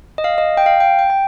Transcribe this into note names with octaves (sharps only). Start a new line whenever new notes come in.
D#5
F5
D#5
G5
F5
G5
G5
G5